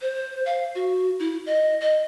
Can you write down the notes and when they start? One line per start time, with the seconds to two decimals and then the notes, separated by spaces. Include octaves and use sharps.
0.02 C5
0.46 F5
0.75 F#4
1.20 E4
1.46 D#5
1.81 D#5